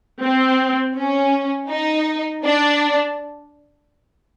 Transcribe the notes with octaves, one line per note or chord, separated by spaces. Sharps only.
C4
C#4
D#4
D4